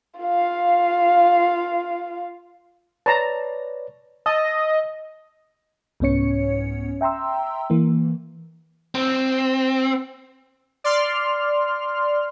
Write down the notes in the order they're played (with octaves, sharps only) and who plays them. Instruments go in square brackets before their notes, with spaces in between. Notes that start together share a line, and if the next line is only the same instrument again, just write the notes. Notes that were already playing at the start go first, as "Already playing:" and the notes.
[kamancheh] F4 F5
[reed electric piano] B4 C#5 D5 [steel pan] A5 A#5
[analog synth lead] D#5 [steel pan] A5 [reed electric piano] E6
[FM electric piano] C2 G#2 B3 C#4 C#5 C#7
E5 G5 A#5 C6 E6
E3 A#3
[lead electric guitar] C4
[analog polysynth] D5 C6 F6